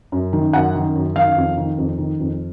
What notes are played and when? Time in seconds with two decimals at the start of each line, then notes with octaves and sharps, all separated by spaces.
0.12 F#2
0.33 D#3
0.53 F#2 F#5
0.75 D#3
0.95 F#2
1.16 D#3 F5
1.37 F2
1.57 D#3
1.78 F2
1.98 D#3
2.20 F2